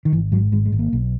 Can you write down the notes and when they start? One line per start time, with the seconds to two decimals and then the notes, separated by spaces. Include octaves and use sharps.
0.05 D#3
0.13 G#1 E3
0.32 G#2 F#3
0.52 G#1 G#3
0.65 G#3
0.72 G#1
0.79 A#3
0.93 B1